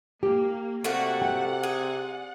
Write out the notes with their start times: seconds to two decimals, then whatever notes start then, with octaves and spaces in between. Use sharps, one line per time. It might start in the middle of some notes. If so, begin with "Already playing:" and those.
0.23 A#3 G4
0.84 C3 A3 A#3 F#4 D5 F#5
1.22 G5
1.63 G#4